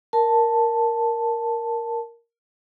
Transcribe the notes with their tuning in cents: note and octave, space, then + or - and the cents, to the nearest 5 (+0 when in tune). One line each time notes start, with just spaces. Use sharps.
A#4 +0 A5 +0